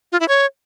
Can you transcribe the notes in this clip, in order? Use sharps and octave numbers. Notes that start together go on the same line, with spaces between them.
F4
E4
C#5